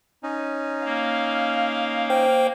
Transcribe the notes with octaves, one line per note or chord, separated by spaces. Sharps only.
C#4 D#4
A#3 F5
C5 G5